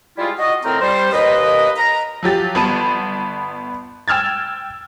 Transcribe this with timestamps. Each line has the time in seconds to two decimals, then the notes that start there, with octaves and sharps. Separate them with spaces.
0.18 G3 G#3 E4 F4
0.38 F#4 D#5
0.64 A2 D#3 C4 A#4 C5 A#5
0.81 G3 C5
1.12 D#2 B4 D#5
1.76 A#5
2.23 F3 F#3 G4 A6
2.55 G1 B3 A5 D#7
4.08 G5 E6 F6 G#6 A6